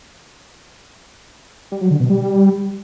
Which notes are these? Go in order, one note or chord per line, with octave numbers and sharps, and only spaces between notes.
G3
F#3
D3
B2
G3